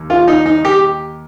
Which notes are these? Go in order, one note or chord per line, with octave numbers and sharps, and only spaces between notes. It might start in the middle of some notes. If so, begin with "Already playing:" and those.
Already playing: D#2
F4
D#4
D#4
G4